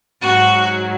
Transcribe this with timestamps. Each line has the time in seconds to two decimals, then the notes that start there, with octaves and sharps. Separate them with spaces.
0.21 G#2 F#3 F#4